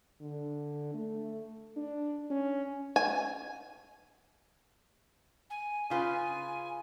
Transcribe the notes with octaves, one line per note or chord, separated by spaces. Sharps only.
D3
A3
D4
C#4
G#5
G#5
C#3 F4 B4 G#5